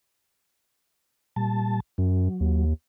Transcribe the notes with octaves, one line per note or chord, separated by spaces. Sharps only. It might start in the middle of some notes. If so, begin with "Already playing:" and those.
A#2 G3 A5
F#2 F#3
D#2